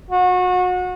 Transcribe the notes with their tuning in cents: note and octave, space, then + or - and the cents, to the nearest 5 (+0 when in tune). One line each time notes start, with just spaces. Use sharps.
F#4 -30